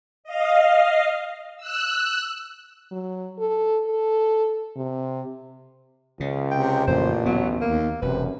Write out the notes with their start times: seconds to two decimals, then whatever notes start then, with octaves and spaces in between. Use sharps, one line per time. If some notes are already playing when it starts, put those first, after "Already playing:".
0.24 D#5 F5
1.57 E6 F#6
2.91 F#3
3.39 A4
3.87 A4
4.76 C3
6.20 C#2 C#3
6.51 C3 G5
6.87 A1 F2 A#2 C#3 C5
7.26 D2 F#3 B3
7.61 D#2 A#3
8.02 E1 F#2 C3 B4